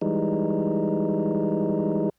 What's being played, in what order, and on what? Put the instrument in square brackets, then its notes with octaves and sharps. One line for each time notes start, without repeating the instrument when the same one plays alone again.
[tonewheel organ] E3 G3 G#3 D#4